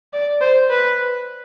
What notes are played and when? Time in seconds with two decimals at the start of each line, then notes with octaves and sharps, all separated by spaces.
0.13 D5
0.41 C5
0.70 B4